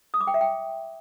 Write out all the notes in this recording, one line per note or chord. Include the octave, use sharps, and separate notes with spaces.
D#6
D6
G5
E5
G5